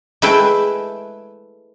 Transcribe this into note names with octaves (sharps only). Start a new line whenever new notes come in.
G#3 A3 E4 B4 E5 G5